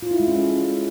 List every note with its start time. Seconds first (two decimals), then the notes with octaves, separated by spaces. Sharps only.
0.02 F4
0.11 E4
0.20 G#3
0.28 C#4
0.37 A4